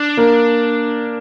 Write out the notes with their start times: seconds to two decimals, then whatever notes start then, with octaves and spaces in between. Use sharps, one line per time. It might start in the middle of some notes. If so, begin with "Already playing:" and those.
Already playing: D4
0.17 A#3